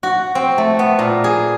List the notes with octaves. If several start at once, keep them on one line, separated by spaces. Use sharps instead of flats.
F#4
C4
A3
B3
A#2
G#4